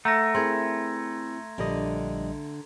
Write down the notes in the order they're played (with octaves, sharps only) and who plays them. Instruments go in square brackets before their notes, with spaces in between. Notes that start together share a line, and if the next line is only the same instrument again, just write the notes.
[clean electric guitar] A3 [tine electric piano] F#5 [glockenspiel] A#5 A#6
[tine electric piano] C4 E4 [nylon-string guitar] G#4 A#4 [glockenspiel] C6 G#6
[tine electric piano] A#1 G3 D#5 [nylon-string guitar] D3